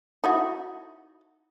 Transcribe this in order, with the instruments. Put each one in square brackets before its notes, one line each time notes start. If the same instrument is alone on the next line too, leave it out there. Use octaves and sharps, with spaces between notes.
[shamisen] D#4 E4 F#4